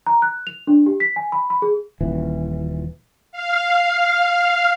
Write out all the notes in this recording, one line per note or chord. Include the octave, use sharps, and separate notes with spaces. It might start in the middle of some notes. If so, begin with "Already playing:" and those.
A#5
F#6
F7
D4
G4
B6
G#5
B5
B5
G#4
D#1 E3
F5